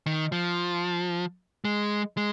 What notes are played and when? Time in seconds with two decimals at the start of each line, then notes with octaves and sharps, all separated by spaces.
0.06 D#3
0.32 F3
1.65 G#3
2.17 G#3